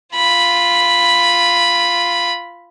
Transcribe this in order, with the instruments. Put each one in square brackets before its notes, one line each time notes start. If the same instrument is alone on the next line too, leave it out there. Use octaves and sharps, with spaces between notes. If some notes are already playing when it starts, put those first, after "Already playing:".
[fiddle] F4 B5